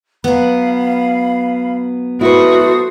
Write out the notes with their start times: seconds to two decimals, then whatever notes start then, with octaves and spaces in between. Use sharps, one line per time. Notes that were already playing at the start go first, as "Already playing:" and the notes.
0.24 F#3 B3 F5 B5
2.21 E4 F#4 A4 B4 C5 D#6